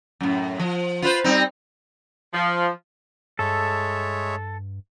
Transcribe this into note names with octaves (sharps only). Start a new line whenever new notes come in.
F#2 A2
F3
F4 B4 C5
G3 C4 D#4
F3
G2 G#3 A4 C#5 E5